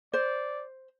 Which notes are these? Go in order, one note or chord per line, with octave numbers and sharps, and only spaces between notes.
C5 D5